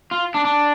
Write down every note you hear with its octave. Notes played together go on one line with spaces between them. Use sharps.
F4
D4
D4